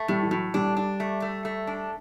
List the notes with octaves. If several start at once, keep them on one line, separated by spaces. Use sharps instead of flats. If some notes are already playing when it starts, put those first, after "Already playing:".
Already playing: A3
A2 G3
E3
A2 F#3
G3 D4
D4
A3
A3
A3
D4